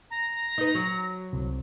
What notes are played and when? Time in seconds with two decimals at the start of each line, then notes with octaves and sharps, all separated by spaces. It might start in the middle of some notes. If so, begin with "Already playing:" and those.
0.10 A#5
0.58 D#4 B4
0.75 F#3
1.33 C2 C3